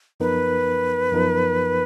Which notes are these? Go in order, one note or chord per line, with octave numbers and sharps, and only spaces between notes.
F#2 F3 B3 D#4 A#4 B4
F#2 F3 B3 D#4 A#4